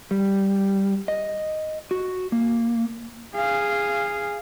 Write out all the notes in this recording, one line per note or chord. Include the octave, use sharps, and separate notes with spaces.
G3
D#5
F#4
A#3
G#4 F5